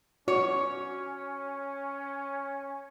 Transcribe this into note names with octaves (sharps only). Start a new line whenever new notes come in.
C#4 F#4 C#5